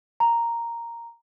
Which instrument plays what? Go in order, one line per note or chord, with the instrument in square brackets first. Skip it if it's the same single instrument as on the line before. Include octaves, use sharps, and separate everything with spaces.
[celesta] A#5